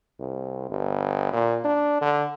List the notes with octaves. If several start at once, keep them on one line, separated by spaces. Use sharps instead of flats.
C2
G1
A#2
D4
D3